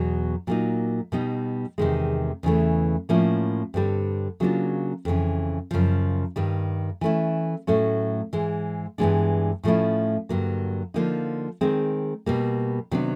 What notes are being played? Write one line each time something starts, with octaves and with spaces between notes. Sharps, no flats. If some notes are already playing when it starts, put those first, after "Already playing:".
Already playing: E2 B2 F#3
A#2 F#3 A#3 D#4
B2 G3 B3 D#4
E2 C3 D#3 G#3
E2 C#3 E3 A3
A2 F3 A#3 C#4 E4
G2 D3 G3 C4
C#3 F#3 A#3 D4 F4
F2 C#3 E3
F#2 C#3 F3
G2 D#3 G3
E3 A3 C#4 E4
A2 F#3 A3 C#4
G#2 E3 G#3
G2 E3 G#3 B3 D4
A2 F3 A3 C#4 E4
G2 D3 F#3 A#3
D3 F3 A#3 D#4
D#3 G#3 C4
B2 G3 A#3
C3 D#3 F#3 B3 D4